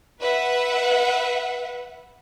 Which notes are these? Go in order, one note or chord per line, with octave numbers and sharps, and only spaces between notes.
B4 E5 F#5